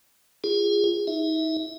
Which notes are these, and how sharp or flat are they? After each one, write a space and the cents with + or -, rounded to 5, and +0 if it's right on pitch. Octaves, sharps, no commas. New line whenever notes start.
F4 -20 G#4 -25
D#4 +30 E5 -20